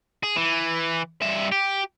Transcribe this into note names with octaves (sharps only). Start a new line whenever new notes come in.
G#4
E3
G2 E5
G4